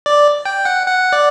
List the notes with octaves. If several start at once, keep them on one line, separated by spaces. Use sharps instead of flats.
D5
G5
F#5
F#5
D5